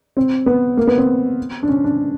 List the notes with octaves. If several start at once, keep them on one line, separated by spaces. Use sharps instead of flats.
C4
B3
A#3
B3
C4
D4
C#4
D4